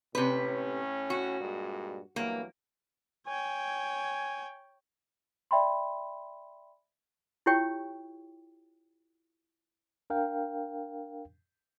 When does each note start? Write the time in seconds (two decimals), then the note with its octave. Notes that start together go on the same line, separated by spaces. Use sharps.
0.15 A2 C3 C#4 B4
1.10 F#4
1.41 G2 A#2 G#3
2.16 G2 E3 F#3 A#3
3.27 C#5 G5 G#5
5.51 D5 E5 G5 B5 C6
7.46 E4 F4 G4 C#5 G5 C#6
10.10 D4 A#4 F5 G5